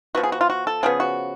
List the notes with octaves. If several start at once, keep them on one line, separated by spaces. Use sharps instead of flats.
F3 B3 F#4
G#4
F#4
F4
F#4
A4
C#3 F3 B3 G#4
F#4